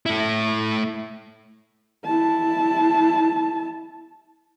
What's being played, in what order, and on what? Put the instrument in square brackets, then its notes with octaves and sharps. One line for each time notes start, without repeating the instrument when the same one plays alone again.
[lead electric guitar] A3 E4
[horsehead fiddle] E4 A5